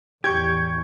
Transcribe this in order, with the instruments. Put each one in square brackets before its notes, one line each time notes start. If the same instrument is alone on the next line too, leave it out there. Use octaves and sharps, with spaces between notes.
[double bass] A1 E2 [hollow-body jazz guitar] G4 [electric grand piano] C#6 G6 G#6